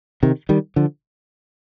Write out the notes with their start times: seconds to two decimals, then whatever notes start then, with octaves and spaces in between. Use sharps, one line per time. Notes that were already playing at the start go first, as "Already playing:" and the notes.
0.23 C3 D#3
0.49 D#3 G3
0.76 D3 F3